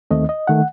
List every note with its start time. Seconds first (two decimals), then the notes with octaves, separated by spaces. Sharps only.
0.11 D#2 D#3 A3 C4 D#5
0.29 D#5
0.47 D#3 A3 F#5